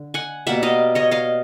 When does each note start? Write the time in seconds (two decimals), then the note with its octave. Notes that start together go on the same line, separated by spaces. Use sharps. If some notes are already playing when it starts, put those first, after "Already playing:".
Already playing: D3
0.14 F#5 G#5
0.47 B2 G3 A#3 E5 F#5
0.63 D#5 F5
0.95 C#5 D#5
1.11 D#5 F5